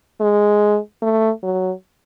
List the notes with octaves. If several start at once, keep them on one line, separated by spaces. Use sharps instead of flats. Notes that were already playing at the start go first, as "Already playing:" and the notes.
G#3
A3
F#3